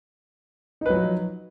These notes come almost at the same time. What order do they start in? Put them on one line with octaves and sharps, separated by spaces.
D#4 B4 F#3 F3